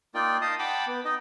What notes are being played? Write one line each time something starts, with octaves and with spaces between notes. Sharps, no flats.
A#3 D#4 F4 D5 G5
D#5 F5 A5 D#6
F#5 G5 A5 B5 D6
B3
D#4 D#5